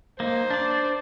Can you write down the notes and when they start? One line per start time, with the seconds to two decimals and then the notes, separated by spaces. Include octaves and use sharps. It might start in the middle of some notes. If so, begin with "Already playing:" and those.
0.20 A#3 D#4 C5
0.50 D4 D5